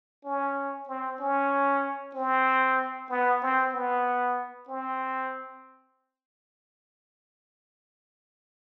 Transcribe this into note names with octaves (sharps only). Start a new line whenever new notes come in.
C#4
C4
C#4
C4
B3
C4
B3
C4